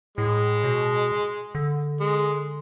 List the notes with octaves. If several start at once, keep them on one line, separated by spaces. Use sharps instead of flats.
A2 G#3
B2
D3
G#3